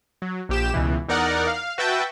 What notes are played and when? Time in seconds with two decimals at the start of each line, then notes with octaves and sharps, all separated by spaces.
0.22 F#3
0.49 A#1 G4 E7
0.74 C#2 B2 E3
1.08 E2 D#4 A#4 D5 F#5
1.47 F5
1.78 F#4 B4 E5 G5 A5